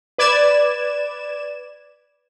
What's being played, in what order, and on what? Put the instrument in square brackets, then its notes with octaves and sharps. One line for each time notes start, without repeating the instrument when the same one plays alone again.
[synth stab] B4 D5 G#6 E7